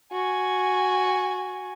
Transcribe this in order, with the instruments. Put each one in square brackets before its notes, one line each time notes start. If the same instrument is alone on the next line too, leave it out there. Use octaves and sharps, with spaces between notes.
[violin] F#4 G#5